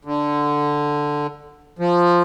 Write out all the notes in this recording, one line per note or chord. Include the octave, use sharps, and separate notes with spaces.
D3
F3